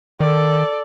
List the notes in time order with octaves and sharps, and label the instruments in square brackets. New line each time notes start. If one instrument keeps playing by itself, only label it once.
[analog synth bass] D#3 [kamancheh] A4 D5